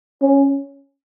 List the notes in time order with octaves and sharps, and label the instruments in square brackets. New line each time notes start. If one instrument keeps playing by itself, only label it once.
[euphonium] C#4